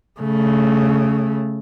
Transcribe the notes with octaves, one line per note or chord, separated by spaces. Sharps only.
C#3 A3